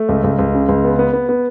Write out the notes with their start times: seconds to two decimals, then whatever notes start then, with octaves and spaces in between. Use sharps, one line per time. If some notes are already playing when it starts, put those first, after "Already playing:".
Already playing: A3
0.09 C#2
0.24 C#2
0.39 C#2
0.54 C#3
0.69 C#2
0.84 B3
0.99 B3
1.13 B3
1.29 B3